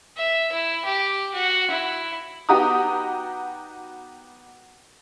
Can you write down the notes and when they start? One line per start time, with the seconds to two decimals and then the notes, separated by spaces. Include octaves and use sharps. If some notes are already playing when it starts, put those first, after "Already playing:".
0.17 E5
0.52 E4
0.85 G4
1.34 F#4
1.71 E4
2.49 B3 D#4 F#4 G4 A#5 D#6